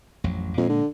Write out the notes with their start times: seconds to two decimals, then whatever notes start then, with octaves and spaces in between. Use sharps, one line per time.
0.24 A1 F2 F#3
0.57 F2 A#2 G#3
0.69 D3